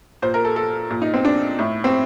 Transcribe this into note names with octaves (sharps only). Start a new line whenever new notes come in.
A#2 C5
A#4
A4
A4
A#2
D#4
C4
D4
A2
C4